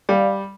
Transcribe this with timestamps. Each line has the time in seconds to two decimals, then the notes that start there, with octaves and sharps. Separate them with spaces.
0.09 G3 D5 F5